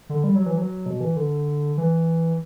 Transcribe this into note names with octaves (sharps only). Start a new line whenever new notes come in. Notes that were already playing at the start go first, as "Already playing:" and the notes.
D3
G3
F#3
E3
F#3
B2
E3
D3
E3